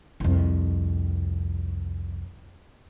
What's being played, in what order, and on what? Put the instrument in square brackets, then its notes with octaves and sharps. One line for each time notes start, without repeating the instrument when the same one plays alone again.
[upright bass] C2 F2